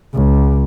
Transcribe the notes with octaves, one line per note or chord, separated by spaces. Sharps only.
C#2